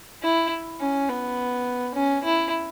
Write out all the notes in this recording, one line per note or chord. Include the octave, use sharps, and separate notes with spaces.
E4
C#4
B3
C#4
E4